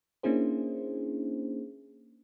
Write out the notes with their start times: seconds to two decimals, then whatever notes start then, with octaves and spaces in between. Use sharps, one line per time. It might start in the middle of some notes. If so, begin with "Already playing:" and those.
0.23 A#3 C#4 D4 E4 G#4 C5